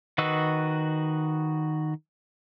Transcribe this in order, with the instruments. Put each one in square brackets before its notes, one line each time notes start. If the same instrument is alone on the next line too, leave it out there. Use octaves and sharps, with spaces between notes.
[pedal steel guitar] D#3 F#4 B4 D#5 E6